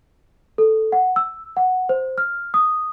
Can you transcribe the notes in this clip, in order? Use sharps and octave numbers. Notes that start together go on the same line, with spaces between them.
A4
F#5
E6
F#5
C5
F6
D#6